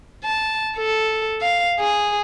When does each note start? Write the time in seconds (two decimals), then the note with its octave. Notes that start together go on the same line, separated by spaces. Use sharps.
0.24 A5
0.78 A4
1.42 F5
1.80 G#4